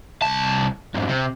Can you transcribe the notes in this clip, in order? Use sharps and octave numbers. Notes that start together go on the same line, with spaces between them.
C2 A5
F2 G#2
C3